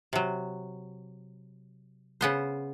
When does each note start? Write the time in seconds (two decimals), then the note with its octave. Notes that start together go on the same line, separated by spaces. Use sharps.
0.13 C3 F#3
2.21 C#3 B3 C5